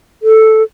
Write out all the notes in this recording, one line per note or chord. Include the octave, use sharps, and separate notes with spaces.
A4